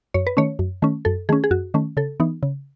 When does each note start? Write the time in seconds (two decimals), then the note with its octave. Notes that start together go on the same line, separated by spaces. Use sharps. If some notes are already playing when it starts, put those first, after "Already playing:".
0.14 F#2 C#5
0.27 B4
0.37 D#3 A3 C#4 C#5
0.59 F#2
0.82 D#3 A3 C#4
1.05 F#2 A4
1.29 D#3 A3 C#4 G#4
1.44 G#4
1.51 F#2 F#4
1.74 D#3 A3 C#4
1.97 C#3 A4
2.20 E3 B3 D#4
2.43 C#3